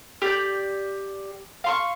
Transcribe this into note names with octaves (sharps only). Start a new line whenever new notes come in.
G4 D5 G6
F5 C6 C#6